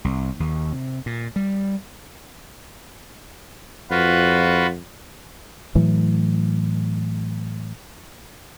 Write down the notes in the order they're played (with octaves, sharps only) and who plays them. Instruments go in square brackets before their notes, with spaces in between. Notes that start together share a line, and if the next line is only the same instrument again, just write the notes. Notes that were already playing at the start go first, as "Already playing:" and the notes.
[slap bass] C2
D#2
C3
A#2
G3
[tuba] F2 [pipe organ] F4 F#4 B4
[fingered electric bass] A2 E3 F#3 A3